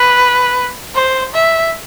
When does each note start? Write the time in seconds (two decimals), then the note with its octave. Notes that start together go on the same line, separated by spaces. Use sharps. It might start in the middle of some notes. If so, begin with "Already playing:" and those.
Already playing: B4
0.95 C5
1.34 E5